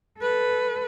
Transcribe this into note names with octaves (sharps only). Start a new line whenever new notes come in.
A4 B4